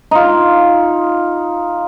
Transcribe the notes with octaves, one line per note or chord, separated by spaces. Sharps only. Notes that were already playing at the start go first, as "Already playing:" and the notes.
D#4 F4